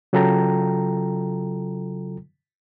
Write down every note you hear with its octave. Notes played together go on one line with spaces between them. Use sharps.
C#3 F#3 F4 A4 G5 A#5